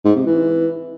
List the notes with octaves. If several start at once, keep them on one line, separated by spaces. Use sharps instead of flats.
G#2
C3
E3